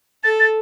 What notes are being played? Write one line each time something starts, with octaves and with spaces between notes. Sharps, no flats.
A4 A6
A6